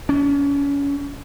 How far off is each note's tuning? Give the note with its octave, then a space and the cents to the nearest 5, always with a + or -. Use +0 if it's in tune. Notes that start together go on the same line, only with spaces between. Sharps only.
C#4 +30